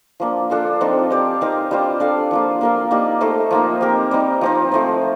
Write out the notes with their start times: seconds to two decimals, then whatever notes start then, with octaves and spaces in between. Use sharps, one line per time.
0.20 F3 A#3 D4
0.50 D4 F4 A4 C5
0.81 F3 C4 D#4 A4
1.10 C4 G4 D5
1.41 C4 D#4 A#4 F5
1.71 G3 D4 F4 C5
2.00 D4 A4 D5 F5
2.31 F3 A#3 F4
2.61 A#3 F4 A#4 F5
2.91 A#3 D#4 G4 D5
3.21 A3 D#4 A4 C5
3.51 F3 A#3 D#4
3.81 C4 G4 A#4
4.11 G3 C4 D#4
4.41 F3 C4 D#4
4.72 F3 A3 C4